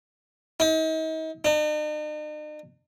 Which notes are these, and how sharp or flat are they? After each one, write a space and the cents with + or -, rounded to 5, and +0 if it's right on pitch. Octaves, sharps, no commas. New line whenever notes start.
D#4 +40
D#4 -45